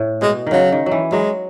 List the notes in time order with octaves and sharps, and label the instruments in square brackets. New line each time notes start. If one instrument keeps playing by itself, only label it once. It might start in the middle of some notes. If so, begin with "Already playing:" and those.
Already playing: [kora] A2
[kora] B2 [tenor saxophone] G#3
[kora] D#3
[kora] C#3 [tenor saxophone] F#3
[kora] D#3
F#3
E3
[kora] F#3 [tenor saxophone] G#3